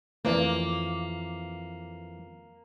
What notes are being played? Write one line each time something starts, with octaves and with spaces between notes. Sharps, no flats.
F2 E3 A3 A#3 B4 D5